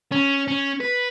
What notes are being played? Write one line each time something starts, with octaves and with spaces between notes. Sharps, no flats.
C#4
C#4
B4